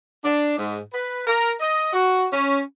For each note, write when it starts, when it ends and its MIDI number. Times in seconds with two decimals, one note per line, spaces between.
0.23 0.55 62
0.57 0.79 44
0.91 1.22 71
1.25 1.50 70
1.59 1.91 75
1.92 2.26 66
2.31 2.60 61